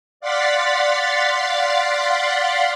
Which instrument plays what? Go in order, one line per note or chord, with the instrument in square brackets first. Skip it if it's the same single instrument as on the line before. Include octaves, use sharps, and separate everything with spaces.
[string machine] D5 F5 F#5 C6 A6 B6